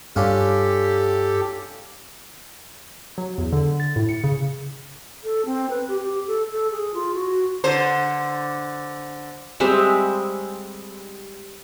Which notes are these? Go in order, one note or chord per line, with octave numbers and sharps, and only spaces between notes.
G2 C#4 D4 F4 G4 A4
F#3
E2
D3
A6
A2
C#7
C#3
A4
C4
B4
G4
G4
A4
A4
G#4
F4
F#4
D3 C5
G3 G#3 C4 E5